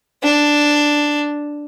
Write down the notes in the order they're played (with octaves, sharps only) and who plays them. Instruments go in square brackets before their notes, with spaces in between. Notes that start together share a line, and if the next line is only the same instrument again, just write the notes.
[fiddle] D4